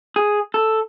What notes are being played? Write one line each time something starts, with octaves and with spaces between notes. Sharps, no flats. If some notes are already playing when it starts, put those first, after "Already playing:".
G#4
A4